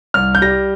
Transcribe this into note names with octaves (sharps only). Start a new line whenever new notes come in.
C2 F6
G6
G3 A#6